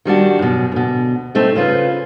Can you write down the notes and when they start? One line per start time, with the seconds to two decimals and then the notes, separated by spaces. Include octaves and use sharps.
0.05 D#3 G3 D4 F#4
0.39 F#2 B2
0.72 D2 B2
1.35 A3 C4 D#4
1.55 C#3 C#4 F4 B4